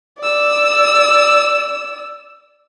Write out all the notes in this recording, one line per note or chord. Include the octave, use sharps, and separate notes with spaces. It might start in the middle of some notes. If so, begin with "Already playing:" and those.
D5 E6